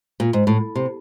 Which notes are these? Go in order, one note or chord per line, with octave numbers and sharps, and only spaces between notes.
A#2
G#2
A2
C3